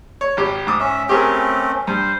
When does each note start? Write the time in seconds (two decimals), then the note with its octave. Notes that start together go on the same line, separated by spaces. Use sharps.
0.21 C#5
0.37 G#1 G4
0.67 G#2 D6 D#6
0.80 C#4 E5
1.09 A3 C4 C#4 G4 G#4 A#4
1.87 G2 C5